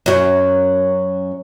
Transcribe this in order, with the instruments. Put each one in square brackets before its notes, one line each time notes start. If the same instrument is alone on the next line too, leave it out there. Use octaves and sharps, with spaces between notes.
[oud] F#2 F#3